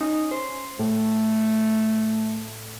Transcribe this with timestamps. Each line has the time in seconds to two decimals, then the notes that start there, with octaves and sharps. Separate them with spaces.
0.01 C#4 D#4
0.31 C5
0.79 A2 A3